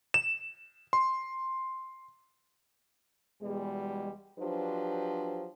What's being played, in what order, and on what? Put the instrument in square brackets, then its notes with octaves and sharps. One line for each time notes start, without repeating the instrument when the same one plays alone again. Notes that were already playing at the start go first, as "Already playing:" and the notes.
[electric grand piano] E7
C6
[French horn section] E2 B2 G3 G#3
F3 F#3 D4 G4 B4 C5